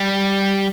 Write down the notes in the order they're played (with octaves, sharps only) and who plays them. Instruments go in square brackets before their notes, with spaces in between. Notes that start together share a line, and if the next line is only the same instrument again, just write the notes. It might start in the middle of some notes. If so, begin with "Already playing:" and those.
Already playing: [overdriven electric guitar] G3